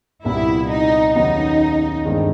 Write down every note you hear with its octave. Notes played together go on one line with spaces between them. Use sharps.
C2 A#2 G3 B3 E4
D#4
D#2 C#3 F#3 B3 D#4
G1 G2 D#3 G#3 C4